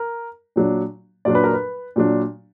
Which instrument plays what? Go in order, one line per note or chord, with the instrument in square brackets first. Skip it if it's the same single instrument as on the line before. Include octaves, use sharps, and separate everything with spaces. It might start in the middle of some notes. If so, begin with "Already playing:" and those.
Already playing: [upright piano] A#4
A#2 F#3 D4
A#2 F#3 D4 D5
B4
A#4
B4
A#2 F#3 D4